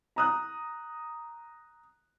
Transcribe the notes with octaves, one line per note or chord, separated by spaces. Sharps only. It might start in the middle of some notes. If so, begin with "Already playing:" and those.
A#5 D#6 F#6